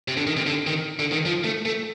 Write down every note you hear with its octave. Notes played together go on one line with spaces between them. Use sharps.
C3
D3
D#3
C3
D3
D#3
D3
D#3
F3
A3
A3